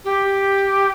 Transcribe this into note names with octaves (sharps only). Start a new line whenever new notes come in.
G4